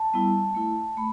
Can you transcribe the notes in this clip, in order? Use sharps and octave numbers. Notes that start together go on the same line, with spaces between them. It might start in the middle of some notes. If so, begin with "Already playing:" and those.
Already playing: A5
G3 B3 E4
A3 E4
A3 B5